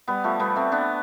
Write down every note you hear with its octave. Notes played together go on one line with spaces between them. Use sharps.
G3 B3
F3 A3
G3 B3
A3 C4
B3 D4